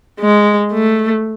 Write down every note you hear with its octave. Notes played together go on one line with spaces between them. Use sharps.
G#3
A3